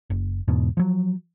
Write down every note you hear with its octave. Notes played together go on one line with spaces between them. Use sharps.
F#1
E2 G#2 B2
F3 F#3